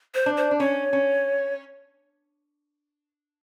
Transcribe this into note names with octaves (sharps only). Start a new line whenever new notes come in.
C5
D4
C5
D4
C#4 C#5
C#4